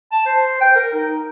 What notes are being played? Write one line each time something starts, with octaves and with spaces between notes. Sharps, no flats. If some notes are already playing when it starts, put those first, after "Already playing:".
A5
C5
G5
A#4
D#4